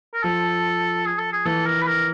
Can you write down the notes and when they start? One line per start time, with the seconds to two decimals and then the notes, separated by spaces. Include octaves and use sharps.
0.14 A#4
0.23 F3 A4
1.06 G#4
1.18 A4
1.32 G#4
1.45 E3 A4
1.66 A#4
1.81 B4
1.86 A#4